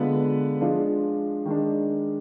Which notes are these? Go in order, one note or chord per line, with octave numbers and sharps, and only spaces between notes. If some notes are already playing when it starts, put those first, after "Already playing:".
Already playing: D3 G#3 B3 F4 B4
F3 G#3 D4 F4
D#3 G#3 D4